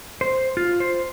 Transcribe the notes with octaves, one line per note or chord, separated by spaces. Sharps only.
C5
F4
C5